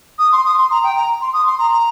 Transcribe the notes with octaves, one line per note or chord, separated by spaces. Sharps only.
D#6
C6
D#6
C6
A#5
G5
A#5
C6
D#6
C6
A#5
A#5